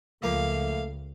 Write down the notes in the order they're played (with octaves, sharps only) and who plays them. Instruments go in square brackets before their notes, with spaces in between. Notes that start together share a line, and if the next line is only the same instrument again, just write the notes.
[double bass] C#2 [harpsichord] F3 A#3 [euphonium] A3 [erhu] F5